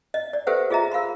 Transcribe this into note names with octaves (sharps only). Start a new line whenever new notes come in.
D#5
D5
G4 A4 B4 C5 E5 F#5
F4 G#4 D#5 E5 A#5
A#4 F5 B5 C6